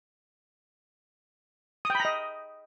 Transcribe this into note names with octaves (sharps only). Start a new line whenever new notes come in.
D#5 G5 A#5 B5 D#6